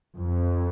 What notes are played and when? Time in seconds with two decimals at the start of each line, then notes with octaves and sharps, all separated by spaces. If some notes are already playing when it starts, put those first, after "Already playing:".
0.15 F2